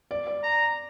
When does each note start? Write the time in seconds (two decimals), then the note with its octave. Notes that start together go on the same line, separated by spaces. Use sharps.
0.11 D5
0.27 D5
0.44 A#5